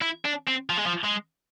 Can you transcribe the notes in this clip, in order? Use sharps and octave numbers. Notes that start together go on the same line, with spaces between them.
E4
D4
C4
F3
G#3
F3
G#3